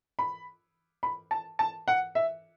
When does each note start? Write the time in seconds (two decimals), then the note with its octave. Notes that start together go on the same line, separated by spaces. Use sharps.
0.19 B5
1.03 B5
1.31 A5
1.59 A5
1.88 F#5
2.15 E5